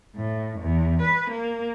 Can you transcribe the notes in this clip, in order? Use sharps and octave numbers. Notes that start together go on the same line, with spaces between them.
A2
E2
B4
A#3